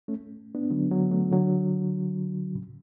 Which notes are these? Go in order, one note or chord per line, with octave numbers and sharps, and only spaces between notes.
A3 C#4
B3 D4
D3 F#3
D3 F#3
F#3 A3
D3 F#3
A2 C#3